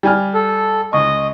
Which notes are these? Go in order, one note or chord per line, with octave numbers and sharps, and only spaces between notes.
G3 G#5 F6
A4
C#2 D#5 C#6